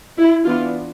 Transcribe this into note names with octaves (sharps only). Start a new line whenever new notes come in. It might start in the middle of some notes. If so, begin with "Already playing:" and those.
E4
E3 B3 D4 F4